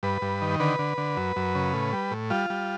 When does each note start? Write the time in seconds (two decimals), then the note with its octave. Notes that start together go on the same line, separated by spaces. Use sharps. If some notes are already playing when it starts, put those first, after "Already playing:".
0.03 G2 B4
0.22 G2
0.42 D#3
0.60 D3 B4
0.79 D3
0.98 D3
1.17 F#2
1.36 F#2
1.55 C#3
1.73 A2
1.93 G3
2.11 A2
2.30 G3 F4
2.50 G3